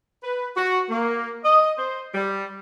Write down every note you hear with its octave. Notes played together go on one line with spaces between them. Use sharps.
B4
F#4
A#3
D#5
C5
G3